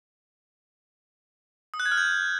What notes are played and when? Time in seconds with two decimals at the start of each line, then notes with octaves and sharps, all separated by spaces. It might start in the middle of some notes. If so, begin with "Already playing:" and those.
1.74 D#6
1.80 F#6
1.86 G#6
1.92 F6
1.97 G6